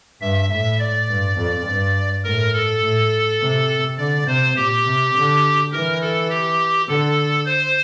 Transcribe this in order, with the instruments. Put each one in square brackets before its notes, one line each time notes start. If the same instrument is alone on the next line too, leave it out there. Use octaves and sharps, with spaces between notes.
[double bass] G2 [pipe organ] E5
[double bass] A2 [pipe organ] E5
[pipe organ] D5
[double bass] G2
F2
G2
[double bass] A2 [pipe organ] A#4
[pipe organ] A4
[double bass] A2
C3
[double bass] D3 [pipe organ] D5
[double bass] C3 [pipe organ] C5
[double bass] A#2 [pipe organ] G4
[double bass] C3
D3
[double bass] E3 [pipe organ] A#4
[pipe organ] A4
G4
[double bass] D3 [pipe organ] A4
[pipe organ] C5